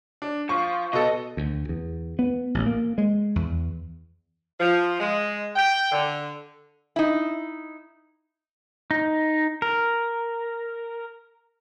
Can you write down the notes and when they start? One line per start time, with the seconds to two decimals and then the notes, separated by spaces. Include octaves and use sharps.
0.22 D4
0.49 F3 C#6
0.93 B2 A4 D#5
1.37 D2
1.69 E2
2.19 B3
2.54 A1
2.66 A#3
2.98 G#3
3.36 E2
4.60 F3
5.00 G#3
5.56 G5
5.92 D3
6.96 D#4 E4
8.91 D#4
9.62 A#4